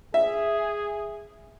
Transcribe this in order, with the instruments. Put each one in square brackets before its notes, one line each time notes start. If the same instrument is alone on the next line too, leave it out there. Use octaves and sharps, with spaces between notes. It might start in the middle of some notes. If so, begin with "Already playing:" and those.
[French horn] G#4 [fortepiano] E5